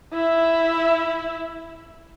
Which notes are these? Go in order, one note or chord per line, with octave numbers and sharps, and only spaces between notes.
E4 E5